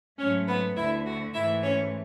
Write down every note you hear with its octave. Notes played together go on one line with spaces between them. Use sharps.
G#2 F#3 A3 C#4 C#5
B3 B4
D2 D3 A3 E4 E5
F#4
G#2 E3 A3 E4 E5
C#4 C#5